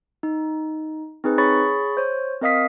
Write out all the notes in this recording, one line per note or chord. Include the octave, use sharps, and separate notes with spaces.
D#4
C4 D#4 G#4 B4
G#4 C#5 B5 C#6 A6
C5 C#5
C4 A#4 D#5 F5 D#6 B6